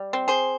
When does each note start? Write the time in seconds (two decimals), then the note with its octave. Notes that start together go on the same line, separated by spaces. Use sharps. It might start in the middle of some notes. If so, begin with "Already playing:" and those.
Already playing: G3
0.13 C4
0.28 G#4 C5